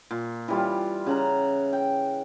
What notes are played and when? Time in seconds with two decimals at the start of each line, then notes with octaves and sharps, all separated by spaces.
0.11 A#2
0.48 E3 G3 F4
1.06 C#3 F#5 A#5
1.73 G5